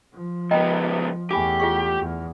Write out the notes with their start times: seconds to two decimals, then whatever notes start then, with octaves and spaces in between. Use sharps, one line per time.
0.14 F3
0.51 C#2 B3 D#5 G5 A#5
1.31 E2 A3 G4 G#5 B5 D6
1.60 F4 G#4 C#6
2.01 E2